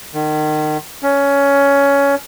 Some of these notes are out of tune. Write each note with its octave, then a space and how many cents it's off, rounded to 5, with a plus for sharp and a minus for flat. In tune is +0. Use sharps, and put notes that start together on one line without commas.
D#3 -30
C#4 +15